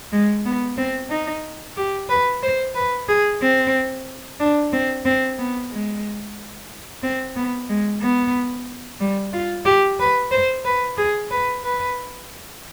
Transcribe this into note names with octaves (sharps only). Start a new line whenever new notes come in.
G#3
B3
C4
D#4
G4
B4
C5
B4
G#4
C4
D4
C4
C4
B3
G#3
C4
B3
G#3
B3
G3
F4
G4
B4
C5
B4
G#4
B4
B4